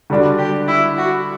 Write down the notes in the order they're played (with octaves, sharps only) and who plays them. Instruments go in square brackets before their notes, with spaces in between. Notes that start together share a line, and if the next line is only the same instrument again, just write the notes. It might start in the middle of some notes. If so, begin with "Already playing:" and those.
[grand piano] D3 G3 D4 F#4
[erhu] G4
E4
F#4